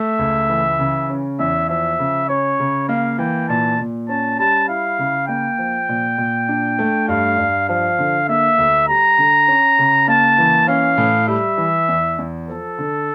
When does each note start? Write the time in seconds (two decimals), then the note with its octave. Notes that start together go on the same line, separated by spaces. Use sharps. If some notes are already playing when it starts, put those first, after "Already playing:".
Already playing: A3 E5
0.19 C#2
0.49 E3
0.79 C#3
1.10 C#4
1.39 E2 E5
1.69 F3 E5
1.99 C#3
2.29 C#4 C#5
2.60 C#3
2.89 A#3 F5
3.18 E3 G5
3.49 A#2 A5
3.79 A#2
4.09 C#4 A5
4.39 G3 A5
4.69 E4 F5
4.99 C#3
5.28 A#3 G5
5.58 F3
5.89 A#2
6.18 A#2
6.49 D4
6.79 A3
7.08 G2 F5
7.38 G2
7.68 F3 F5
7.99 D3
8.28 A#3 E5
8.58 D2
8.88 G3 A#5
9.18 D3
9.48 C#4
9.79 C#3
10.08 A#3 A5
10.38 E3
10.68 C#4 F5
10.98 A2
11.28 G3 E5
11.57 E3
11.89 E2
12.18 E2
12.48 F3 A4
12.78 D3